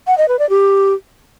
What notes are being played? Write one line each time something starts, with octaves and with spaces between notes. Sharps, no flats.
F#5
D#5
B4
D5
G4